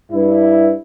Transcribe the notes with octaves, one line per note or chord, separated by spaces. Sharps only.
G2 E4